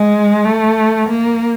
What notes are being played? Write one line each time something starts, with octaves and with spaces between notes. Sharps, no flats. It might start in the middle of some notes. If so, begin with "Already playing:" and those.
Already playing: G#3
A3
A#3